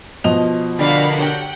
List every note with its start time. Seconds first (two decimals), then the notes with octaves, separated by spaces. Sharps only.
0.24 B2 F3 D#5 F7
0.79 D3 G3 D4 F#4 A#4 D5 F5 B5
1.19 G4 C#5 F#5 G5